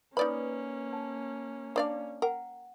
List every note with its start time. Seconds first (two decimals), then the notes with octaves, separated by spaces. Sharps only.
0.17 A#3 C#4 D#4 B4 D5 B5 D#6
0.93 A5
1.76 D4 D5 F5
2.22 A#4 F#5 G5